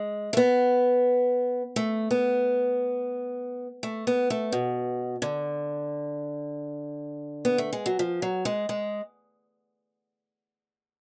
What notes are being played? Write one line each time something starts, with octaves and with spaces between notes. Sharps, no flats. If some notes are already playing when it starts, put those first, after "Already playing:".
Already playing: G#3
A3
B3
A3
B3
A3
B3
A3
B2
D3
B3
A3
G#3
F#3
F3
F#3
G#3
G#3